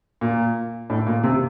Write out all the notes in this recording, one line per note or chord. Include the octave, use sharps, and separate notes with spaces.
A#2
A2
A#2
C3